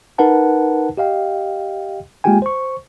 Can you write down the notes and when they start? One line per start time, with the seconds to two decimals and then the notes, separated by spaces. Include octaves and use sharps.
0.18 D#4 A#4 B4 F#5 A5
0.97 G4 D#5 F5 G5
2.24 G#3 A#3 F4 G4 G5 G#5
2.42 C5 C#6